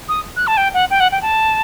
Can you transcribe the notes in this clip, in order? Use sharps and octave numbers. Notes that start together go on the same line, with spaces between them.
D#6
F#6
A5
G5
F#5
G5
F#5
G5
A5